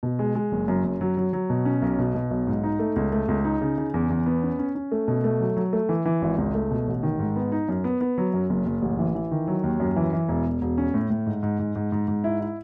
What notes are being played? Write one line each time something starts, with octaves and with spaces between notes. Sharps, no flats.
B2
G#3
G#3
F#1
F#2
F#2
F#3
F#3
F#3
B2
C#4
B1
B2
B2
B1
G#2
D#4
A3
C#2
A3
C#2
D#4
C#3
C#3
E2
E2
B3
C#4
C#4
C#4
A3
B2
A3
F#3
F#3
A3
E3
E3
G#1
C#2
A3
B2
A1
D#3
G#2
B3
D#4
F#2
B3
B3
F#3
F#2
F#1
F#1
A1
E3
E3
D#3
F#3
D#2
F#2
E3
E3
E1
E1
E1
C#4
A2
A2
G#2
G#2
G#2
G#2
G#2
G#2
E4
E4